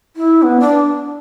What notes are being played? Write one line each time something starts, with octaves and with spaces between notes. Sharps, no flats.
E4
B3
D4